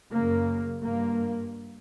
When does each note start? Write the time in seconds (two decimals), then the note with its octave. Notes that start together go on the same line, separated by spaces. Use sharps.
0.11 C#3 A#3
0.17 F#2
0.82 G2 A#3